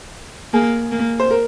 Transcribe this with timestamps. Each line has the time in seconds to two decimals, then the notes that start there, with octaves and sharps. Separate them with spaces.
0.53 A#3 G#4
0.92 A#3
1.20 C5
1.31 A#4